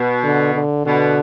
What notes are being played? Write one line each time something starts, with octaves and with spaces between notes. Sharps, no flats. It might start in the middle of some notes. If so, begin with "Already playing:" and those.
Already playing: B2
D3
D3
B2 D3